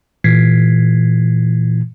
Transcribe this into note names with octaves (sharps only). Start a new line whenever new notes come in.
A#2 E3 G#6 B6 C7